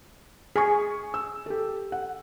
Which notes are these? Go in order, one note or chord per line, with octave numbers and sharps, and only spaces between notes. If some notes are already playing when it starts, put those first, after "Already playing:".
G#4 G#5 C#6
E6
G4 A4
F#5